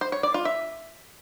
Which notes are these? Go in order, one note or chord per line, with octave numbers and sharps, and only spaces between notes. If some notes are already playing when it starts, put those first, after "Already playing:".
C5
C#5
D5
F4
E5